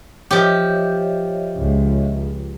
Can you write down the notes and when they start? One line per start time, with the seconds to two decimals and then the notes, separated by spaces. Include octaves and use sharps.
0.31 F3 G4 C#5 D#5 E5
1.57 C#2